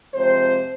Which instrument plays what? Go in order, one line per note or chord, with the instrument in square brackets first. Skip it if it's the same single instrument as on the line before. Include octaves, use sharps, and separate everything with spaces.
[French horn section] C3 F3 G#3 C4 C5